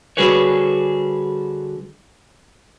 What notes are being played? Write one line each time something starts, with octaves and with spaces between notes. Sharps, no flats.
D3 G3 F#4 G#4 B4 C#5